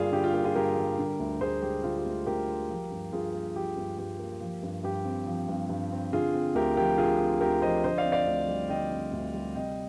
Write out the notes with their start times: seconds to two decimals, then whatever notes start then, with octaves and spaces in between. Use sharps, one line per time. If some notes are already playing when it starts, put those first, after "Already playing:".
Already playing: G2 D3 G3 A#3 F4 G#4 D5 F5
0.12 D3 G4
0.24 F4
0.33 A#3 G4
0.45 F4 G#4
0.55 G2 G4 A#4
0.77 G3
0.99 D3
1.20 D2
1.40 D2 G#4 C5
1.62 G#3 G4
1.83 D3 F4
1.98 G4
2.06 D2
2.26 D2 G4 A#4
2.49 G#3
2.69 F3
2.90 G2
3.13 G2 F4 G#4
3.34 A#3
3.56 F3 G4
3.77 G2
3.98 G2 G4
4.19 A#3
4.41 F3
4.63 G2
4.83 G2 G4
5.05 C4
5.26 F3
5.48 G2
5.69 G2
5.92 C4
6.13 D3 F4 G#4
6.34 C4
6.55 D2 G4 A#4
6.77 F3 G4 A#4
6.98 D3 F4 G#4
7.20 C4
7.41 D2 G4 A#4
7.62 F3 C5 D#5
7.84 D3 C5 D#5
7.98 D5 F5
8.05 C4
8.12 D5 F5
8.27 D2
8.48 G3
8.69 D3 D#5 G5
8.91 C4
9.13 D2
9.34 G3
9.55 C3 D#5 G5